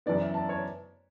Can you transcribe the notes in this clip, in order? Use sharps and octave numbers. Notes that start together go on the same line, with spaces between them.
F#2 E3 B3 D5
E5
A5
C#5